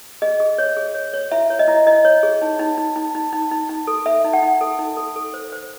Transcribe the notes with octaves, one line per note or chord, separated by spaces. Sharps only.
G#4 D#5
G#4
C#5
G#4
C#5
C#5
E4 E5
C#5
D#5
E4
E4 D#5
C#5
G#4
D#4
D#4
D#4
D#4
D#4
D#4
D#4
D#4
A4
A4 E5
D#4
F#5
D#4
A4
D#4
A4
A4
C5
C5